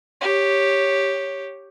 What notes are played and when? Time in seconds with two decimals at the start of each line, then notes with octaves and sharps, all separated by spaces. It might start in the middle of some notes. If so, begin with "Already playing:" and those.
0.21 G4 C#5